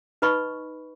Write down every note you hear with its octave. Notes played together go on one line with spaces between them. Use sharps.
D#4 B4 D#5 B5 C#6